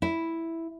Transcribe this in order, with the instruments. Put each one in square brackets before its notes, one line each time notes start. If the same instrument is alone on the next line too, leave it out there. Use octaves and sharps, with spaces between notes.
[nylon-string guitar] E4